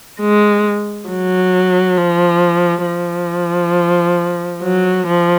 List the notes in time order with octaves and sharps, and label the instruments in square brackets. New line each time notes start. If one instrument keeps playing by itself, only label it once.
[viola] G#3
F#3
F3
F3
F#3
F3